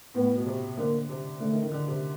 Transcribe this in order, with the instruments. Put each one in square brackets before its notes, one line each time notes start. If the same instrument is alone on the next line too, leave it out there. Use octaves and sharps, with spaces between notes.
[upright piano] A2 [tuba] B3
[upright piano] B2
C3
[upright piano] D3 [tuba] A#3
[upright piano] C3
[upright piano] D3 [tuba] A3
[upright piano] D#3
D#3
D3
C3